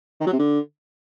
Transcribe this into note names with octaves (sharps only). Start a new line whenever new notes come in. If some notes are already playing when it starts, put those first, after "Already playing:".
D#3
F#3
C3
D3